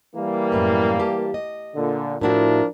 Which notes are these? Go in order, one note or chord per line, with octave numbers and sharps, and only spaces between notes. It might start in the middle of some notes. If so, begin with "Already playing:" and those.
E3 G3 A#3
F#2 A2 B4
G4 A5
D#5
A#2 D3
A2 F3 D4 E4 F#4 A#4